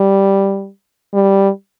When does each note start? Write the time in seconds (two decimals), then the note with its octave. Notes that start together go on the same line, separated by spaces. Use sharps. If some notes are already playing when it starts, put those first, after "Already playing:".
Already playing: G3
1.14 G3